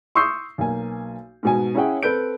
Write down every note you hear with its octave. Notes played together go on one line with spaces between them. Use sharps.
C6 C#6 D#6 E6 G6 C7
B1 A#3 G#5
G#2 B2 G#5
C#4 E4 G#4 C#5 F#5 G5
C4 A4 B4 G6 D7